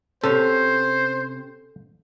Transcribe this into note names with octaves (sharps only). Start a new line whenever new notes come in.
C3 C#4 A4 C5